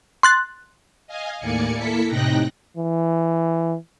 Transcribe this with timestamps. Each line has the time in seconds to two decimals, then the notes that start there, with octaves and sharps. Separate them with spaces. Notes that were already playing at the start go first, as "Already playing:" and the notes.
0.23 C6 F#6 A6
1.07 D#5 F5 G#5
1.40 D#2 A2 A#3 D5 G#5 C#7
1.75 A#3 E4 A4 B6 C#7
2.08 A2 C3 D#4 G5 F#6 A#6
2.77 E3